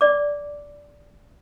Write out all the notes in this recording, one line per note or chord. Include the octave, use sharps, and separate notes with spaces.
D5 D6